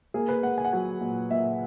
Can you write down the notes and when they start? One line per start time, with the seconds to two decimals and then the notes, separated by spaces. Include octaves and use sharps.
0.14 A#3 G#4
0.28 B4
0.43 A#3 F#5
0.58 G#5
0.65 F#5
0.73 F#3 G#5
1.01 A#2
1.31 A#2 E5